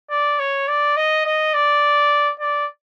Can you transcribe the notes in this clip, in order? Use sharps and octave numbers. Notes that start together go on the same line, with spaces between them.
D5
C#5
D5
D#5
D#5
D5
D5